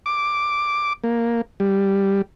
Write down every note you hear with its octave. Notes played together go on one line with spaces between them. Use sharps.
D6
A#3
G3